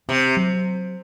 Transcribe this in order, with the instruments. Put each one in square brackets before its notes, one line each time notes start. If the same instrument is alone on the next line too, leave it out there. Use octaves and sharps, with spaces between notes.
[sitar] C3 [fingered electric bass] C4
[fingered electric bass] F#3